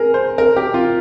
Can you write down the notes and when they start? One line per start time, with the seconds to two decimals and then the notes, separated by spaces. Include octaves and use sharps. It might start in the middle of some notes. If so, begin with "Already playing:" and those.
Already playing: G#4 A#4
0.14 C5
0.38 A#4
0.56 G4
0.74 F4